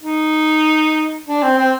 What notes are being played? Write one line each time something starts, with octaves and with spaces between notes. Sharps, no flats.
D#4
D4
C4
C4